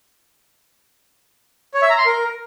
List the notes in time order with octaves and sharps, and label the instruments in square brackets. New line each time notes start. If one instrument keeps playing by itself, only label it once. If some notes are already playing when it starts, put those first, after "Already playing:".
[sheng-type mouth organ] C#5
E5
A#5
C6
A#4